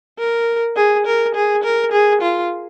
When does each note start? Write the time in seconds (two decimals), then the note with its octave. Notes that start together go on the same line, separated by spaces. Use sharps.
0.19 A#4
0.76 G#4
1.06 A#4
1.35 G#4
1.64 A#4
1.92 G#4
2.22 F4